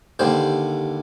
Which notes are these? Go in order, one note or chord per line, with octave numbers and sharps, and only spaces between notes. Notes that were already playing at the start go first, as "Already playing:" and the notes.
D#2 D3 G3 C5